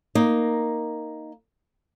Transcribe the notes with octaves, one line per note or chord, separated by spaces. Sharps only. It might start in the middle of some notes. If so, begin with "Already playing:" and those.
A#3 D#4